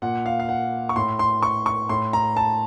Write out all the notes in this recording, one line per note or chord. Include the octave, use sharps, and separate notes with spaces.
A#2 F#5
F5
F5
F#5
C#6
A2 C6
C6
C#6
C#6
A2 C6
A#5
A5